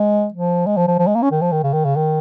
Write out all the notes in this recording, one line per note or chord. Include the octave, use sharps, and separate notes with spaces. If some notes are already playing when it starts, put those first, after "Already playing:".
Already playing: G#3
F3
G#3
F3
F3
F3
G#3
A#3
C#4
D#3
F3
D#3
C#3
D#3
C#3
D#3